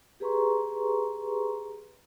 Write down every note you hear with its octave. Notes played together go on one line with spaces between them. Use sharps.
G4 G#4 B4 A#5 C6 C#6